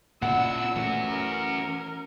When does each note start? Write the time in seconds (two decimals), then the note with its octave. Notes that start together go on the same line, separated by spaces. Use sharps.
0.22 A#2 C#3 D4 E4 F#5 E6
0.76 E3 A3 C#4 F#4
1.09 A#4